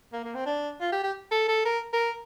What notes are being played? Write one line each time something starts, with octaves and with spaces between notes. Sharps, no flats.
A#3
A#3
C4
D4
F4
G4
G4
A4
A4
A#4
A#4